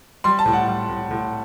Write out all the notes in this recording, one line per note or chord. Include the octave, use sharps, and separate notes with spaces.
G3 C6
A5
A2
F#5
G3
A2
A2